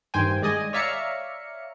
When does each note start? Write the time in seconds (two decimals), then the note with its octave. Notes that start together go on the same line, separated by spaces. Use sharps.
0.14 G2 D#3 C5 G5 G#5
0.42 G#3 D5 D#5 G#5
0.73 C#5 D5 E5 F5 A#5 C#7